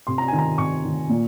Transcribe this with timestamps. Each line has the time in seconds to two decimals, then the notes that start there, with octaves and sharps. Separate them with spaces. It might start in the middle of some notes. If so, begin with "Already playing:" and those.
0.07 C3 C6
0.18 A#5
0.28 D#3 G#5
0.38 A#5
0.58 C3 C#6
0.84 D#3
1.09 A#2